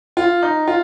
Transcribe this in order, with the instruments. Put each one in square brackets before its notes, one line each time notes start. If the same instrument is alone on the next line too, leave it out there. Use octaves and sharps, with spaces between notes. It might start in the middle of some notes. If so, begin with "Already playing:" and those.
[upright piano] F4
D#4
F4